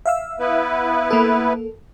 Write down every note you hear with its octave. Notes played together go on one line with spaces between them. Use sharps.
E5 F5 E6
B3 E4 B4
A#3 A4